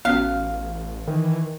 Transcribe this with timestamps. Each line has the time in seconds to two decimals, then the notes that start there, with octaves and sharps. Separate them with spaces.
0.05 A1 B3 C#4 F#4 F5
1.07 D#3 E3